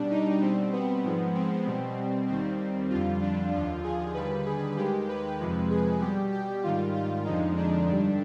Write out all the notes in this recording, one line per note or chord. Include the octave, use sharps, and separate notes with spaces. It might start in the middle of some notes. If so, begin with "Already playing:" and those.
Already playing: B2 G3 D4
D#4
B2 G3 C4
B3
G#2 F3 G#3
C4
B2 G3
D#2 D#3 G3 C4
F2 D3 G3 F4
D4
D#2 D3 F3 F4
G#4
D#2 D3 G3 B4
G#4
D#2 D#3 G#3 G4
B4
F2 C3 F3 G#3
G#4
B2 G3 G4
G4
G#2 D#3 G3 F4
F4
F2 D3 F3 G#3 D#4
D4
G2 D3 G3